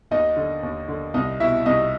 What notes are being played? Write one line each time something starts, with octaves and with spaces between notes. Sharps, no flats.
D#2 D#4 D#5
D3
D#2
D3
C2 D#4 D#5
B2 E4 E5
C2 D#4 D#5